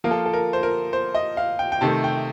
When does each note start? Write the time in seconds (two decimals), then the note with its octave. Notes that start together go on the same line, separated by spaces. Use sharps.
0.04 F3 A#3 F4 A#4
0.11 A4
0.25 A4
0.33 A#4
0.53 C5
0.63 A#4
0.93 C5
1.15 D#5
1.37 F5
1.59 G5
1.72 G5
1.81 C3 D#3 A3 A5
2.04 G5